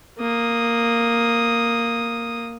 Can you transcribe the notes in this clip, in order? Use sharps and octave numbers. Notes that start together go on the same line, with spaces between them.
A#3 D#6